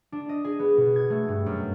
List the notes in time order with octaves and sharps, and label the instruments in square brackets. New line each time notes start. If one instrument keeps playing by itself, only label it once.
[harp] D4
D#5
G#4
B3
B2
G#6
A3
G2
F#2